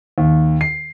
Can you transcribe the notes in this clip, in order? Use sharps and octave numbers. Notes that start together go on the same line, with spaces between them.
D#2
C7